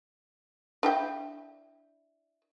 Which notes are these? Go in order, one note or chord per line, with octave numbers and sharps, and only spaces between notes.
D4 E4 G5